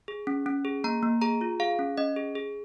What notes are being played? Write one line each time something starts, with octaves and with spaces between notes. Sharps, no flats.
G#4
C#4
C#4
G#4
A#3 A#5
A#3
G#4 A#5
F4
G#4 F5
C#4
C#4 D#5
G#4
G#4